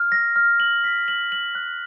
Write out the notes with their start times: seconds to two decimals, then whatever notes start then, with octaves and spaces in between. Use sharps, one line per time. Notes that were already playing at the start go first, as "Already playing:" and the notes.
Already playing: F6
0.12 A#6
0.36 F6
0.60 F#7
0.84 B6
1.08 F#7
1.32 F#7
1.55 F#6